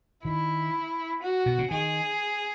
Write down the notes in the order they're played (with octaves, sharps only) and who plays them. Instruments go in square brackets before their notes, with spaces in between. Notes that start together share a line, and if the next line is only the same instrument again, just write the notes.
[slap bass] D#3 [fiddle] E4
[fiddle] F#4
[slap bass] B2
C#3
[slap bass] D#3 [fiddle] G#4